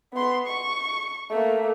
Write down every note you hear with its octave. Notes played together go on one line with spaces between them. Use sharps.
B3 C6
C#6
A3 A#3